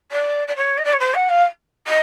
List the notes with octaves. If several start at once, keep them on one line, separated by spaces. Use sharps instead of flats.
D5
D5
C#5
D#5
D5
C#5
C5
F#5
F5
D#5